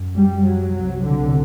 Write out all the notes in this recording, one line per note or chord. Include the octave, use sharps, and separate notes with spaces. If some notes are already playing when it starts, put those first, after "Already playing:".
Already playing: F#2
G3
F#3
C2 C3
D3